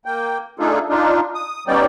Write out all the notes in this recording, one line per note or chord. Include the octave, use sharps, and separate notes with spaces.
A#3 G5
A3 D4 D#4 F4 G#4 A4
D4 D#4 F4
D#6
G3 B3 C#4 D#4 D5 G5